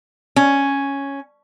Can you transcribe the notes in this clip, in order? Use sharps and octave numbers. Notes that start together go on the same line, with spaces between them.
C#4